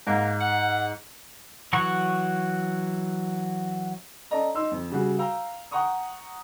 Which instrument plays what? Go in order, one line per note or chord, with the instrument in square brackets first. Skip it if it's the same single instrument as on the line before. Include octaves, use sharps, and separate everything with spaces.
[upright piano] G#2 [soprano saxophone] A#3
[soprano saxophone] F#5
[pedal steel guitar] E3 F#3 F#4 C#6
[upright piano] C#4 A4 D5 D#5 A#5
D#4 C6 E6
F2
C#3 G3 F#4 G#4
F5 G5 A#5 E6
F#5 G5 A#5 C#6 D#6